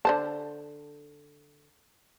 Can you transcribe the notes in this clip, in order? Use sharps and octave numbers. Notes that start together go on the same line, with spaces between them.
D3 C5 A5